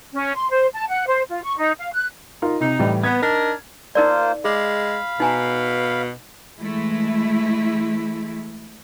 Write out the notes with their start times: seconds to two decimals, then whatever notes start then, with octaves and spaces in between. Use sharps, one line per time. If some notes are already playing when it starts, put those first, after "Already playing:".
0.13 C#4
0.35 C6
0.50 C5
0.74 A5
0.88 F#5
1.07 C5
1.30 F4
1.43 C#6
1.58 D#4
1.79 F5
1.93 F#6
2.42 D#4 F4 A#4
2.60 C3 D#4
2.79 A2 E3 G3
3.04 B3 G#6
3.21 D4 D#4 A#4
3.95 A#3 D#4 F4 A#4 C5 D5
4.45 G#3 G#4 F5 B5
5.20 B2 D#4 G#5 A#5
6.57 E3 G#3 A3 E4